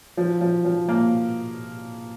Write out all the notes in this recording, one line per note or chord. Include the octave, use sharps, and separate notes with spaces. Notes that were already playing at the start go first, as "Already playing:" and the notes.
F3
F3
F3
A#3